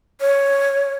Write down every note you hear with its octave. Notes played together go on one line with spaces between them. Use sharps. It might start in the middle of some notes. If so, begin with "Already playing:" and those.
C#5